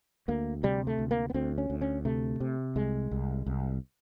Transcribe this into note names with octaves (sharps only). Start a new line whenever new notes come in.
D2 A#3
C3 G3
A3
D2
A#3
B3
D2 C4
C#4
D2
C#4
C3 A3
C3
C2 G#3
C2
C2